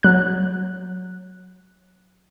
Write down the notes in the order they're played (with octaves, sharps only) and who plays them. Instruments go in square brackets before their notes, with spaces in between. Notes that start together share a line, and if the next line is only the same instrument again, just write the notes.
[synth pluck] F#3 F#6